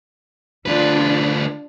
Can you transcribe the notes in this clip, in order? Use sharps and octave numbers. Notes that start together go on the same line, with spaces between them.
D2 D4 F4 B4